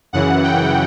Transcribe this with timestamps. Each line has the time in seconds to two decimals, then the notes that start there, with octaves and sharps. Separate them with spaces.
0.13 F#2 C#3 E3 F#5
0.44 G5